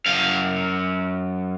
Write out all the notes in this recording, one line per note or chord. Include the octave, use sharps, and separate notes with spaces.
F#2 F5